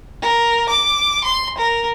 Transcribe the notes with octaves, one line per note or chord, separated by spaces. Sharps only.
A#4
D6
C6
A#4